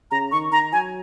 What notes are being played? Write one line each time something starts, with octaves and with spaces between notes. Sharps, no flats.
C#3 A#5
D#3 C#6
D#3 A#5
F#3 G#5